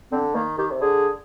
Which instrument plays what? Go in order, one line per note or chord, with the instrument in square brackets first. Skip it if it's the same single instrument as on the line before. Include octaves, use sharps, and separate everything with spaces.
[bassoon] D3 [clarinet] C4
[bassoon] D#3 [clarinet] A#3
[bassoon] D#3 [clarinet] G4
[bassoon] C3
[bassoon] D3 [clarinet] G#4